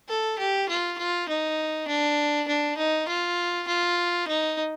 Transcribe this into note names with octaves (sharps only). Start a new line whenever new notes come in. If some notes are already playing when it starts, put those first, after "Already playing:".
A4
G4
F4
F4
D#4
D4
D4
D#4
F4
F4
D#4